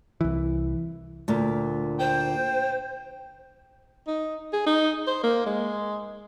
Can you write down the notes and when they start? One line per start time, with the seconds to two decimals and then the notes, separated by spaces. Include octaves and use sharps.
0.21 C2 E3
1.28 D2 A#2
2.00 C5 G5
4.07 D#4
4.53 G#4
4.66 D#4
5.07 C5
5.23 A#3
5.46 G#3